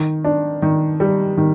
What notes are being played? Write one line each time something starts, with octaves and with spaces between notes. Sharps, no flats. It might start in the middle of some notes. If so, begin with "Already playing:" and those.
Already playing: D#3
D4
D#3
G3
D#3